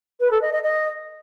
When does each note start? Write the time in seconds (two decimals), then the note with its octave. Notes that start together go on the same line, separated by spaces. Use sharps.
0.20 B4
0.31 A4
0.42 D#5
0.52 D#5
0.63 D#5